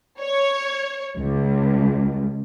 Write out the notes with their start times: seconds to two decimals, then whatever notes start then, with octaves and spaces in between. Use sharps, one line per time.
0.20 C#5
1.17 C#2